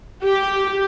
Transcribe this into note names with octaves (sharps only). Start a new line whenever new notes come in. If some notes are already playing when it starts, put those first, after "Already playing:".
G4